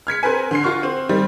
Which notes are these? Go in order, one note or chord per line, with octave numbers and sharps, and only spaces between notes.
F6 G#6 B6 C#7
C4 A#4 B4 G#5
D3 C6 C7
F4 F#4 C#6 F6
C4
D#3 G3 C4